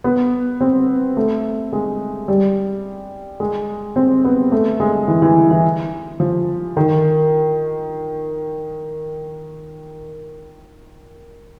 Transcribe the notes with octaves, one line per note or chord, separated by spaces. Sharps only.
B3
C4
A3
G#3
G3
G#3
C4
B3
A3
G#3
E3
E3
E3
F3
D#3